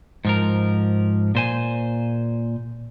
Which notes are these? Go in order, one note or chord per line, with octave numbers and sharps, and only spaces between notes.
G#2 F3 A#4
A#2 C5 G#5